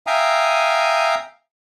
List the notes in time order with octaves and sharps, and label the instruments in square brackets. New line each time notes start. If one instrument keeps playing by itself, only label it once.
[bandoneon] E5 F5 G5 G#5 A#5 D#6